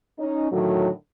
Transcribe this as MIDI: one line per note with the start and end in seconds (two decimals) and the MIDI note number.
0.19 0.48 61
0.19 0.48 63
0.51 0.88 45
0.51 0.88 50
0.51 0.88 51
0.51 0.88 54